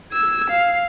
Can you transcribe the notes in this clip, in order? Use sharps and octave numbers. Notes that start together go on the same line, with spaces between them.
E6 G#6
F5